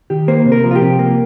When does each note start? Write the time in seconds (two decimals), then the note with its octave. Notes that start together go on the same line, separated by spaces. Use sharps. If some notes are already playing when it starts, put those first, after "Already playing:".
0.10 D#3 G4
0.28 A#3 C5
0.46 C3
0.52 A#4
0.64 F3
0.71 F4
0.75 G4
0.82 C3
0.99 A#3